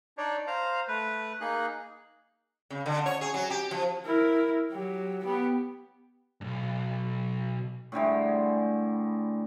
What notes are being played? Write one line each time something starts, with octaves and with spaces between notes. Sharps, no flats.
D4 D#4 C#5 D5
C5 F5 A#5
A3 B4
A#3 D#4 G#4 F#6
C#3
D3
C#5
G#4
F#3
G4
F3
E4 A#4
F#3 G4
B3 G4
B1 G2
A2 D3 G3 G#3